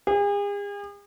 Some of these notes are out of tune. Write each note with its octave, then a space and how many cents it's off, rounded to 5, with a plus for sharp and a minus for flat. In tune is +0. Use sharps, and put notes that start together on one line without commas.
G#4 -40